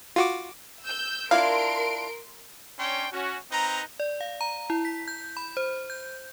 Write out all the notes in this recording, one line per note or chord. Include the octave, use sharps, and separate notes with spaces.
F4 F#4 D6
E6 G6
D4 E4 F4 A#4 F5 C6 D7
C#4 D4 C#5 G5 C6
C#4 F#4
C4 D#4 B4 A#5
D5
F5
A#5
E4
B6
G6
B5
C5
G6